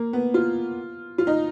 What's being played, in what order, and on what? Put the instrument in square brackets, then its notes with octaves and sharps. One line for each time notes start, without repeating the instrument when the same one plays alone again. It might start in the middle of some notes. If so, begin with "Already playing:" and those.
Already playing: [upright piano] A#3
B3
F4
F4
D#4